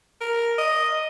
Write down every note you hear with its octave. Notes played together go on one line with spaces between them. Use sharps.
A#4
D#5